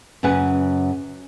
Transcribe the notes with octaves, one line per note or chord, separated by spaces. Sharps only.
F#2 C#3 B4 F#5 G#5